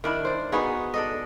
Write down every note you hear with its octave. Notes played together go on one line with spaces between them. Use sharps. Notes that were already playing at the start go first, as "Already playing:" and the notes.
D#3 D4 E4
C5 D5
B3 D#4 F#4 G#4
D4 A4 D#5